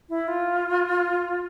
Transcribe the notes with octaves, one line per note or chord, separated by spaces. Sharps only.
E4
F4